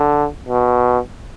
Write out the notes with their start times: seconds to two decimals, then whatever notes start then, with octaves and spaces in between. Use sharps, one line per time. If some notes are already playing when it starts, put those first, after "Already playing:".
Already playing: D3
0.48 B2